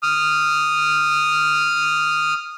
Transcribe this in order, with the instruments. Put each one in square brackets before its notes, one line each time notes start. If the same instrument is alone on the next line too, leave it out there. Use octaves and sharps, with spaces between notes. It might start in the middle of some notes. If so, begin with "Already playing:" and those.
[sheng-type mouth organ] D#6 F6